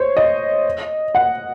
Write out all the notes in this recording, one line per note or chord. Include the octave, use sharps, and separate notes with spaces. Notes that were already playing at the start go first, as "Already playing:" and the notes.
Already playing: C5 C#5
D#5
F#5